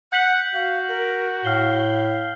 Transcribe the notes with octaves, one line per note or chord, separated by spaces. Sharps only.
F#5 F#6 G6 B6 F#7
F#4 F5
A#4
A2 F5 F6 C7 G7